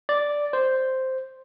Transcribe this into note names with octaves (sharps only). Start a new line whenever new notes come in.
D5
C5